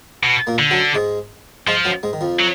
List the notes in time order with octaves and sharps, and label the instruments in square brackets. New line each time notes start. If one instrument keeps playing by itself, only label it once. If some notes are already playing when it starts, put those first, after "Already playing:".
[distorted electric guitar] B2
[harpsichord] A#2 A#3
[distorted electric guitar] D3
[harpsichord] F#2 F#3
G#2 G#3
[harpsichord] G#2 G#3 [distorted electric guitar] F3
[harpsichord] F#2 F#3
G#2 G#3
D#3
F2 F3
[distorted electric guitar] F#3